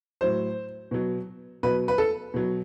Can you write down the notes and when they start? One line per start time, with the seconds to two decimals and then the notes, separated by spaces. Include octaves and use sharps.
0.21 A2 F#3 C5
0.91 B2 F#3
1.63 B2 F#3 B4
1.88 B4
1.98 A4
2.34 B2 F#3